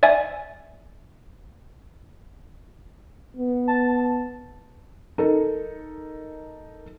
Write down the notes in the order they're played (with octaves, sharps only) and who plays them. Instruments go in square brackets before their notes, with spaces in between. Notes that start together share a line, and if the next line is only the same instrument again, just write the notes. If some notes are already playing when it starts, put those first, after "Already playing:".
[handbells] D5 E5 G#5
[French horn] B3
[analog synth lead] A5
[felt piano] D#4 A4 A#4